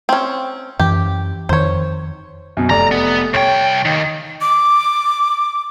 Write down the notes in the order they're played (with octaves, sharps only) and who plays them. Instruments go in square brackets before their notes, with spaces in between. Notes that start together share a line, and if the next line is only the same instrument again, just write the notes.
[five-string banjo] C4 C#4
[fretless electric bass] F#2 E3 [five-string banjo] G4
[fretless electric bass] F2 D#3 [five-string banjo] C5 C#5
[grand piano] F#2 B2
[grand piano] F1 D5 [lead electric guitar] A#5
[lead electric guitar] B3
[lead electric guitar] C2 G5 [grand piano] C#5
[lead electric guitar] D#2 D#3
[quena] D6